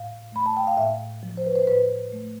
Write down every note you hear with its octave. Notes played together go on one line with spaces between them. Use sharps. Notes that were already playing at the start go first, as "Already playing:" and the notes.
Already playing: A2 F5
A3 B5
A5
G5
F5
A2 E5
F3
C5
B4
C5
A2 B4
A3